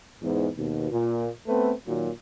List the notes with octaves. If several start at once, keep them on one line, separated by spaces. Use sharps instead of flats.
E2 G#2
D#2 B2
A#2
A3 B3 C4 A4 B4
A#2 D#3 F#3